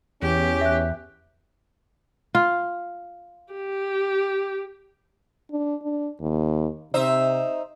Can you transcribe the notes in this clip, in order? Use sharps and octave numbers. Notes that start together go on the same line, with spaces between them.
E2 C#4 G4
E5 F#6
F4
G4
D4
D4
D#2
C3 D#4 C5 E5